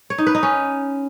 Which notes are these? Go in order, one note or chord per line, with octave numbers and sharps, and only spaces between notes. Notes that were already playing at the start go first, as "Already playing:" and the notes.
C#5
D#4
B4
D#4
C#4